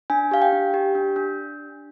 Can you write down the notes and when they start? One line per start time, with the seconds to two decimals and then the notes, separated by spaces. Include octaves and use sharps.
0.10 D4 G#5
0.31 G4 F5
0.42 G5
0.53 D4
0.74 G4
0.95 D4
1.16 D4